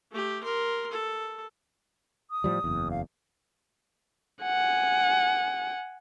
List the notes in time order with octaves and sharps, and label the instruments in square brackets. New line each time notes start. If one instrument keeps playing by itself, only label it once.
[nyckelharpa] A3 G4
A#4 C6
A4
[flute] D#6
[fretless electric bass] A2 F3 G3
F#1 E2
[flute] F5
[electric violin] F#5 G#5